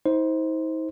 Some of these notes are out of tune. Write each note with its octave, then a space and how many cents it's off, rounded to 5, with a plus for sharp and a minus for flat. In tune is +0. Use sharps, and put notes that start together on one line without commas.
D#4 +45 C5 +0